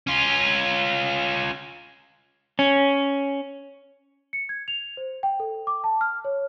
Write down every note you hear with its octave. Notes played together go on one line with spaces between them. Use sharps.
C#4 F4
C#4
C#7
G#6
F7
C5
G5
A4
D6
A5
F6
C#5